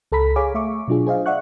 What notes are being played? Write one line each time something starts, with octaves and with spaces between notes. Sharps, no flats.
C#2 A4 A#5 B5 B6
G#4 C#5 F5 G#5 D6
A3 E5 C#6 D6
B2 F#3 D4 F4 G#4
G#4 C5 D#5 F5
D5 E5 F#5 C#6 F#6